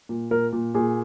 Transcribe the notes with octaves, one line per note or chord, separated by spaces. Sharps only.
A#2
A#2 A#4
A#2
A#2 G#4